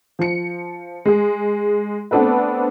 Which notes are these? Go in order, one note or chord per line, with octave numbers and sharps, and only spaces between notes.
F3 C#7
G#3 G#4
A3 B3 C4 D4 A4 B4